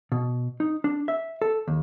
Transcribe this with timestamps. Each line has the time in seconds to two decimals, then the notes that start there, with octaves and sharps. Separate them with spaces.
0.12 B2
0.60 D#4
0.84 D4
1.08 E5
1.42 A4
1.68 D#2